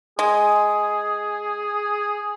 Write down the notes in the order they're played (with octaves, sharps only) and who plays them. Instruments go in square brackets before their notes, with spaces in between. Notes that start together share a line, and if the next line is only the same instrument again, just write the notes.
[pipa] G#3 [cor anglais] G#4